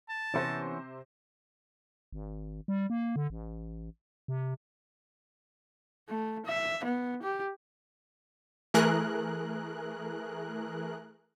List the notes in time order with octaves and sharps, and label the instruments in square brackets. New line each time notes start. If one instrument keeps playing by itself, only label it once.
[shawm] A5
[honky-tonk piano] C3 C5 A#6 [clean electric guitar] E3 B3 C#4
[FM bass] G#1
G3
A#3
D3
A1
C3
[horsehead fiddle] A3
E5
B3
G4
[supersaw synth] E3 A3 G#4 A#4 F#6